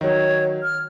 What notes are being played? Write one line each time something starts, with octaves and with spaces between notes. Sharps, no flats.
D#3 F#3 C#5
F6